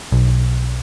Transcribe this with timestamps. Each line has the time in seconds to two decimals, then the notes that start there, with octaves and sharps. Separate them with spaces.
0.12 B1